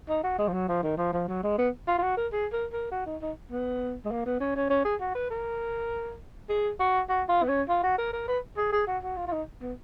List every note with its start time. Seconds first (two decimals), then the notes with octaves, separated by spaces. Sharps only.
0.09 D#4
0.23 F#4
0.38 G#3
0.48 F3
0.53 F#3
0.68 F3
0.83 D#3
0.97 F3
1.13 F3
1.28 F#3
1.43 G#3
1.58 B3
1.87 F4
1.98 F4
2.02 F#4
2.17 A#4
2.32 G#4
2.52 A#4
2.72 A#4
2.91 F#4
3.06 D#4
3.21 D#4
3.52 B3
4.05 G#3
4.11 A#3
4.26 B3
4.40 C#4
4.56 C#4
4.70 C#4
4.85 G#4
5.00 F#4
5.15 B4
5.30 A#4
6.49 G#4
6.79 F#4
7.09 F#4
7.28 F4
7.42 B3
7.48 C#4
7.68 F4
7.83 F#4
7.98 A#4
8.13 A#4
8.28 B4
8.57 G#4
8.72 G#4
8.87 F#4
9.03 F#4
9.17 F4
9.27 F4
9.32 D#4
9.62 B3